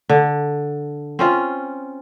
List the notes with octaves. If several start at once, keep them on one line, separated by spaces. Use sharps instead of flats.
D3
C4 C#4 F4